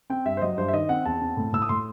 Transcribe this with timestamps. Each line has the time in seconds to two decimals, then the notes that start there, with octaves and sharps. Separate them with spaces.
0.10 C4 G5
0.25 G2 E5
0.37 C5
0.42 F#3 D#5
0.57 G2 C5
0.68 E5
0.73 D#3 D#5
0.89 C4 F#5
1.05 E2 A5
1.21 C4
1.37 A2
1.53 A2 E6
1.62 D#6
1.69 A2 C6